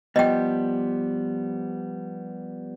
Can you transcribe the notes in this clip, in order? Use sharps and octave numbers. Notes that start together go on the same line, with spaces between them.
F3 G3 B3 D#5 G5